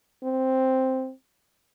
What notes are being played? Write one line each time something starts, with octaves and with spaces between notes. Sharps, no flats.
C4